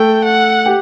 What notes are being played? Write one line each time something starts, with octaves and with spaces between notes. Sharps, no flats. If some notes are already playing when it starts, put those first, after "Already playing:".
Already playing: A3 A4 G5
F#5
G4